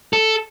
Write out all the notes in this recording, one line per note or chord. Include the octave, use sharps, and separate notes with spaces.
A4